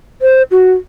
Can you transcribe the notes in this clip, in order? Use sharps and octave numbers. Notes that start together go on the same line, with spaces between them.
C5
F#4